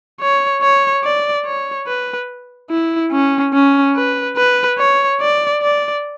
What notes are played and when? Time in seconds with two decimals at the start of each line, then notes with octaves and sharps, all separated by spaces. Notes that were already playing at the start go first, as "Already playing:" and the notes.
0.20 C#5
0.62 C#5
1.03 D5
1.45 C#5
1.87 B4
2.70 E4
3.12 C#4
3.54 C#4
3.95 B4
4.37 B4
4.78 C#5
5.21 D5
5.62 D5